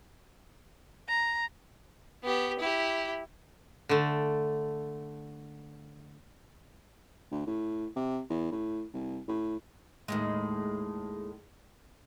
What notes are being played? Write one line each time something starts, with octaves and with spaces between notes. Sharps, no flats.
A#5
B3 G4
E4 G4
D3 A3
D2
A2
C3
E2
A2
C2
A2
D#2 A2 G#3